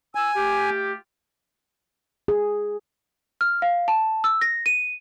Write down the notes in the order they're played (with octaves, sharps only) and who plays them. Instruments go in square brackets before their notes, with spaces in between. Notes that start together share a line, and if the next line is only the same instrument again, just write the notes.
[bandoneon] G#5 [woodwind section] E6
[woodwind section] A3 F4 G4
[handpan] G#4
[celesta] F6
F5
A5
E6
A#6
D#7